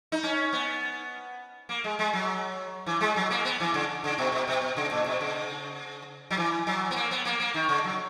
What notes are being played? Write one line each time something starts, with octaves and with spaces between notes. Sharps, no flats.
D#4
C#4
B3
A#3
G#3
G#3
F#3
E3
G#3
F#3
A#3
B3
E3
C#3
C#3
B2
B2
B2
B2
C#3
A#2
B2
C#3
F#3
E3
F#3
B3
A#3
B3
A#3
A#3
D#3
C#3
F#3